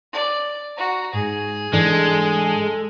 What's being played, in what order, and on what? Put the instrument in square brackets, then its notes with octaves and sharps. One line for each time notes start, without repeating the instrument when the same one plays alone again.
[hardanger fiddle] D5
F#4 A#5
[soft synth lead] G#2 [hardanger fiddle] G#4
[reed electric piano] G#2 E3 D4 [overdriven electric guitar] G#3 [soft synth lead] A4